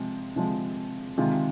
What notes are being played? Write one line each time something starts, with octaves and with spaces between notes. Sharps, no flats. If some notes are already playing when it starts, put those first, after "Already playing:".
Already playing: C3 F3 G#3
C3 F3 G#3
C3 D#3 G#3 F4